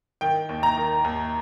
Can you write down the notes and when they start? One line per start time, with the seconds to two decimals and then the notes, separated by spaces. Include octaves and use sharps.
0.21 D#3 G5
0.49 D#2
0.63 A#5
0.78 D#3
1.04 D#2